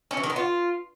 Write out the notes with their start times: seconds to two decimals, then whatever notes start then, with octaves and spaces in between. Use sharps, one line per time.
0.11 C#4
0.17 E3
0.23 D#3
0.30 B3
0.36 F4